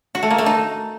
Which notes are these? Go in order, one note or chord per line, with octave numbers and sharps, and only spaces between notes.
F#4
A3
A#3
A3
D#4